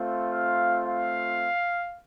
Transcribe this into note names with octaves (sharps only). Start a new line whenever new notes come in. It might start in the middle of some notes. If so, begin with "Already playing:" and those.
Already playing: A3 C4 F4
F5
F5